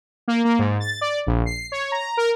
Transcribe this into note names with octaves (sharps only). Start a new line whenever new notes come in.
A#3
A#3
G#2
A6
D5
A#1
C7
C#5
A#5
A#4